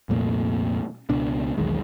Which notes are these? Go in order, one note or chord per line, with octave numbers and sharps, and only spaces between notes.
C2 F2 A#2 A3
C#2 B2 D4
B1 E2 D#3 G#3